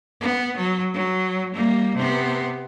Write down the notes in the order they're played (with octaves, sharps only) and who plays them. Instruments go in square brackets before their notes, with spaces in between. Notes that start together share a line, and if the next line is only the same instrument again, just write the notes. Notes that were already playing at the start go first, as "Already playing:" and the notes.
[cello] B3
F#3
F#3
G3 A#3
C3 B3